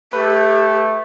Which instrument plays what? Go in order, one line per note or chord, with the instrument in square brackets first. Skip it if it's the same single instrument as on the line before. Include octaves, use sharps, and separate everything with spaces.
[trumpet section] A3 [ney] G4 [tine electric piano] B4